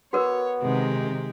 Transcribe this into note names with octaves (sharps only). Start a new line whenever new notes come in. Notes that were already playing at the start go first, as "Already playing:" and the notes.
B3 F#4 A#4 B4 C#5
C3 D#3 G#3 G4